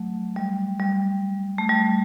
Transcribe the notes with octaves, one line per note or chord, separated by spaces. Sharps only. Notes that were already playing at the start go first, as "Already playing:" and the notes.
Already playing: F#3 A3
G3
G3
A3
G3